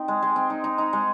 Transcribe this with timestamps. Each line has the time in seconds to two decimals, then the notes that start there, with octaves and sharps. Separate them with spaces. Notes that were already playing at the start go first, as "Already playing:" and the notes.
Already playing: C4 D#4
0.08 G#3
0.22 G#3
0.36 C4
0.50 D#4
0.64 D#4
0.78 D#4
0.93 G#3